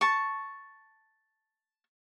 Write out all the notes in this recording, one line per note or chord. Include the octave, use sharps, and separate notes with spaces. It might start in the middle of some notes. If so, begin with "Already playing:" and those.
A5 C#6